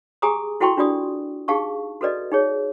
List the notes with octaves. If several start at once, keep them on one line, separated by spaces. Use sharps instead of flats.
G4 G#4 G#5 A#5 D6 D#6
E4 F#4 A4 G5 C6 C#6
D4 F4 F#4 D5 D#6
D#4 G4 G#4 F5 A5 C#6
F#4 A4 B4 D5 D#5
D#4 G#4 C#5